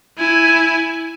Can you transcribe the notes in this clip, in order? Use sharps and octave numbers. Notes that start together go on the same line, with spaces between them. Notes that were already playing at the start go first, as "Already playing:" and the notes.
E4 G#5